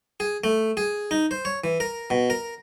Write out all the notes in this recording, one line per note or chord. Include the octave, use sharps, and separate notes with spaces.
G#4
A3
G#4
D#4
C5
C#5
E3
A#4
B2
A#4